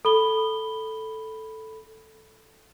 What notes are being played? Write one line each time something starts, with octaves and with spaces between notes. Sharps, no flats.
A4 B5 G7